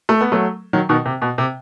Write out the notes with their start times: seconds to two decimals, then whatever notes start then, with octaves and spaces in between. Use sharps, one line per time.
0.09 A3
0.21 B3
0.32 F#3 A3
0.73 D#3 F#3
0.89 B2 D#3
1.05 C3
1.22 B2
1.38 C3